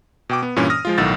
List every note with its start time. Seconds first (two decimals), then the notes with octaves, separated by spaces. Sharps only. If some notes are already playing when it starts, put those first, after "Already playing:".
0.29 B2 G5 D6
0.43 B3
0.56 G2 A#2 E3 C#4
0.70 D#6 F6 A#6
0.85 F3 G#3 F4
0.98 B1 A2 D#3 F#5 E6 A6